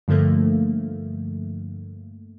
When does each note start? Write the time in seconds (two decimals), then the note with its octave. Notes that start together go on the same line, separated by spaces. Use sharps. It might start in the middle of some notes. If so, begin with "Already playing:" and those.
0.08 G2 D3 F3 A3 A#3